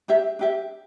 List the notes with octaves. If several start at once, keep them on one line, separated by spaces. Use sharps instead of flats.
D4 G4 E5
D4 G4 E5